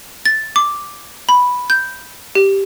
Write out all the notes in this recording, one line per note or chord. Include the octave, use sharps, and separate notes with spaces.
A6
D6
B5
G6
G4